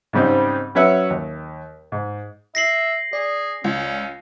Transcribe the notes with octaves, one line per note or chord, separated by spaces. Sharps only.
G#2 C#3 G3 C4 D#4
F#3 C#4 B4 C#5 E5 F#5
D#2
G#2
E5 A#6 C7 F#7
G#4 D5
C#2 C#4